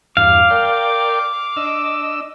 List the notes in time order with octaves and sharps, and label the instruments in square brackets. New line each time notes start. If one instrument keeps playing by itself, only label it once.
[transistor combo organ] E2 G2 [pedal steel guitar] F5 [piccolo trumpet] D6
[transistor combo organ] A#4 D5 G5
D4 D#5 E6